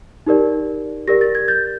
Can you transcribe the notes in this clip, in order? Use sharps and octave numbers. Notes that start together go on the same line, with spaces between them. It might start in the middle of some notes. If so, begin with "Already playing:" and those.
D#4 G4 A#4 D5
G4 A#4 D5 A#6
A6
G#6
G6 A6